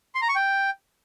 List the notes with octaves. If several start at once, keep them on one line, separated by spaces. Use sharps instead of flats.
C6
A#5
C#6
G5